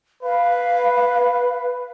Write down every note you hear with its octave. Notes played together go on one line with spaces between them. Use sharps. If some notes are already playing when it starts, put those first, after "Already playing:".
B4 F5